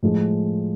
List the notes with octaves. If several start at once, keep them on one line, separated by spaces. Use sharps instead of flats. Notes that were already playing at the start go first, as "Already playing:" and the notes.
A2 F3 G#3